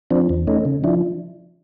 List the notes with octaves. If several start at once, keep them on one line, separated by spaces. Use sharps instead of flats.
F3 C4 D4
E2
A3 C#4 D#4
C#3
F3 D4 E4